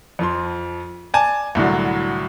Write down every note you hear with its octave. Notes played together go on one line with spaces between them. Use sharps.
F2 F3 C6
D5 G#5 A5
C2 A2 D3 F#3